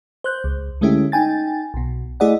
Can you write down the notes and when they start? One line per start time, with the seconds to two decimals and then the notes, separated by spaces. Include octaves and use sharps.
0.24 C5 F#6 G6
0.44 C#2
0.81 D3 G#3 A3 C#4 E4 G4
1.12 D#4 G5 G#5 A6
1.74 B1 B2
2.20 A3 E4 G#4 D5 D#5 F#5